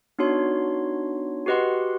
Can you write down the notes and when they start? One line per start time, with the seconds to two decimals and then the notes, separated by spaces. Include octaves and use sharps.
0.19 B3 D4 D#4 F#4 C#5 C6
1.46 F#4 G4 B4 D#5 F#5 C6